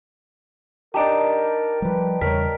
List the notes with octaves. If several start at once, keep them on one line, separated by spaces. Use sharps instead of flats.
D4 D#4 G4 A#4 A5 A#5 D7
F3 G3 B4
E2 C#3 G3 A#4 C#5 B6